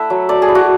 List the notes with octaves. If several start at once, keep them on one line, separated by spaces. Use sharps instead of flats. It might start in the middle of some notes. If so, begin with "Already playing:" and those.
Already playing: A3 E4 E5 F#5
F#3
A3 D5
G#4
E4
F#4